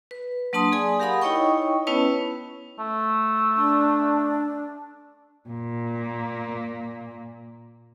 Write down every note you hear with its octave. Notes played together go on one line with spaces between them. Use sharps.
B4
F#3 A#3 D4 A5 C6 D#6
G#4 D5 G#5
G4 A#4 F5 F#5 B5 D#6
D#4 E4 C#5 D#5 G5 C#6
B3 C#4 E4 B4 C#5 A5
A3
D4
A#2 A#3